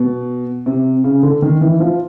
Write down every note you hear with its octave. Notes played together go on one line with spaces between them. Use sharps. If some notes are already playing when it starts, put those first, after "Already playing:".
Already playing: B2
C3
C#3
D3
D#3
E3
F3